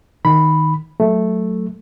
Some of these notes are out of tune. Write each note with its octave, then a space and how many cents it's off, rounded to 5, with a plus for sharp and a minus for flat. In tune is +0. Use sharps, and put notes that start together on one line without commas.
D#3 +0 B5 +0
F#3 +0 A3 +0